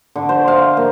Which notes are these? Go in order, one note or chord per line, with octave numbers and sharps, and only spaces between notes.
D3
C5
F5
A#3